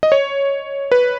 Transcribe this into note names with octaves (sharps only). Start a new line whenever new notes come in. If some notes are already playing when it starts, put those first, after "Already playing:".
D#5
C#5
B4